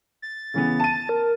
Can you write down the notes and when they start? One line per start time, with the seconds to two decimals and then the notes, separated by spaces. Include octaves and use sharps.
0.22 A6
0.54 C#3 E3 B3
0.80 A5 D#7
1.09 A#4